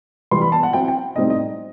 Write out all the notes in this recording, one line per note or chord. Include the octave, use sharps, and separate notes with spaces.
E3 G3 B3 C6
B5
A5
F#5
F#3 C4 E4 G5
G5
A2 G3 C4 D#4 D#5
D#5